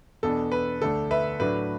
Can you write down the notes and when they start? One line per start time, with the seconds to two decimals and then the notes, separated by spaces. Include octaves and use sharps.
0.23 E2 B2 B3 D4 A4
0.52 B4
0.81 D2 D3 A3 D4 A4
1.11 B4 E5
1.40 A2 F#3 A3 D4 B4